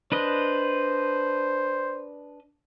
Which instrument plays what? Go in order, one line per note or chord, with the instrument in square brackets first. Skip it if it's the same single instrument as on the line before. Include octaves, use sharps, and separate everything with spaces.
[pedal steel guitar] D4 B4 D#5 [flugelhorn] C5